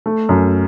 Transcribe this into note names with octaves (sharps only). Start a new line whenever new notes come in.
A3
F#2